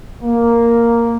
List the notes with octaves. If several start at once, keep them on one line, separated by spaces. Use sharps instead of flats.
A#3